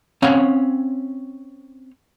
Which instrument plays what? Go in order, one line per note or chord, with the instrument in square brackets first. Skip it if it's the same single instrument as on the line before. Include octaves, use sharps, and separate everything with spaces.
[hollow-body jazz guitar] C4 C#4 C#5 F5 F#5